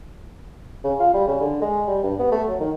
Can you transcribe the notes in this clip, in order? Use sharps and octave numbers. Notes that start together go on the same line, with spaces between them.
C#3
F4
G3
C#3
D3
G#3
G3
G2
B3
A3
F#3
D#3